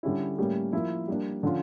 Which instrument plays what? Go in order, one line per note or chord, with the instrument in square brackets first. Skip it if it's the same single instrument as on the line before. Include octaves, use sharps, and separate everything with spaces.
[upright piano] D3 G3 C#4 E4
A2 G3 A#3 C#4 G4
F3 A#3 E4
G3 A#3 D4
D3 F3 C#4 F4